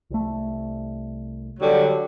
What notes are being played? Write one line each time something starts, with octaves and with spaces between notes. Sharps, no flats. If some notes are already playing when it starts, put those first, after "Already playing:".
C2 A3
D3 F#3 G3